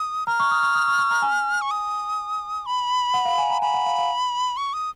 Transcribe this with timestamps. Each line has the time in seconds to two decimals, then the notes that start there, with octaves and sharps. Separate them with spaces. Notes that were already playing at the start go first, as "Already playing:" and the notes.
Already playing: D#6
0.27 A#5 F6
0.40 C#6
0.51 D#6
0.63 C#6
0.75 D#6
0.88 C#6
0.98 C#6
1.11 A#5
1.22 G#5
1.61 C#6
1.71 D#6
2.66 B5
3.14 F#5
3.25 F5
3.38 G#5
3.50 A#5
3.62 G#5 B5
3.74 F#5
3.86 F5
3.98 F5
4.57 C#6
4.73 D#6